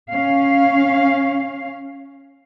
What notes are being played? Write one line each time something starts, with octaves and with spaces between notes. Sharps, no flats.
C#4 F5